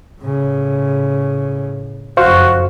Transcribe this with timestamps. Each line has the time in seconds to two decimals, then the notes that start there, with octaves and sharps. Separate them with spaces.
0.20 A2 C#3
2.17 F#1 F2 F#4 C5 F5 C#6